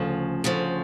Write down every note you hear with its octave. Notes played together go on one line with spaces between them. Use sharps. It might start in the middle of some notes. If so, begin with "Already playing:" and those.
Already playing: D2 C#3 F3
D2 C#3 F3